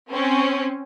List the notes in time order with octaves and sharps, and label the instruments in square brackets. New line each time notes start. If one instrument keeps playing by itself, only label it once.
[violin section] C4 C#4